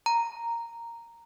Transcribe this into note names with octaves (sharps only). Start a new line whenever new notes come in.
A#5